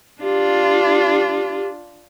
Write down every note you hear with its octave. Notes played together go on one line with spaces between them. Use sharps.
D4 F4 G4